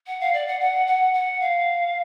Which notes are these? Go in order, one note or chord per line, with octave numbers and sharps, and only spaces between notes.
F#5
F5
D5
F#5
F#5
F#5
F#5
F5